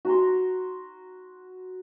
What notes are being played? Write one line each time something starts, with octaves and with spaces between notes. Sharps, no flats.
F#4 A#5 C6